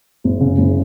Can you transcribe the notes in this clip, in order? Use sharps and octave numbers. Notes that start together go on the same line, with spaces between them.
F#1
C#3
F#1